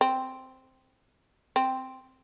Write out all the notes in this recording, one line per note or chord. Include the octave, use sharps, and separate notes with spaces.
C4
C4